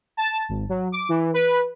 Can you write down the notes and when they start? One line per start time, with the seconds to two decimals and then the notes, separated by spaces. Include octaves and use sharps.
0.17 A5
0.49 G#1
0.69 F#3
0.92 D6
1.09 E3
1.34 B4